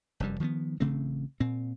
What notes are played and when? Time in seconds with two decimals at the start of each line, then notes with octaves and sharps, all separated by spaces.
0.20 F1 F#2 G3
0.40 D#3 F3 G3 B3
0.80 A1 C#3 A3 C4
1.40 A#2 C4